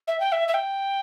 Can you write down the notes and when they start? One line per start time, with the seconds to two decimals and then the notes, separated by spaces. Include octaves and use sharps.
0.07 E5
0.20 G5
0.32 E5
0.48 E5
0.54 G5